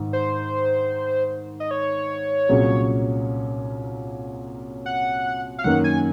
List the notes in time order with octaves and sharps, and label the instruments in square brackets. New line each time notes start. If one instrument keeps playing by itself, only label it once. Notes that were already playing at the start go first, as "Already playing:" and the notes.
Already playing: [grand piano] G#2 D#3
[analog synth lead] C5
D#5
C#5
[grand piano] C2 A#2 F#3 C#4 G#4
[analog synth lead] F#5
F5
[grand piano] F#2 D#3 A#3 D#4 [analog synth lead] F#5
[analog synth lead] G#5